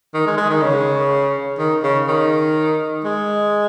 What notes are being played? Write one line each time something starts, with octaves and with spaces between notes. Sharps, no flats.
D#3
G#3
G#3
D#3
C#3
D#3
C#3
D#3
G#3